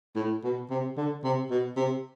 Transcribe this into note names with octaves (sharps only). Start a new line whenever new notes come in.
A2
B2
C3
D3
C3
B2
C3